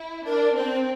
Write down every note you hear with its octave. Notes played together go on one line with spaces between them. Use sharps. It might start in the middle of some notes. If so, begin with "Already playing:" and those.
Already playing: E4
D4 A#4
C4 C5